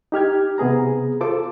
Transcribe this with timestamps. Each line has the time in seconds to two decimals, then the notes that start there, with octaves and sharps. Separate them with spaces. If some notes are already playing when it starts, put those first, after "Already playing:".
0.12 D#4 G4 F6 G#6
0.58 C3 B3 G#4 A#5
1.21 F4 A4 C5 D6